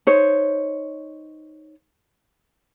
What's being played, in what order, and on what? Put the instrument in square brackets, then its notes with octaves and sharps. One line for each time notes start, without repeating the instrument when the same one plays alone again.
[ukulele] D#4 C5 C#5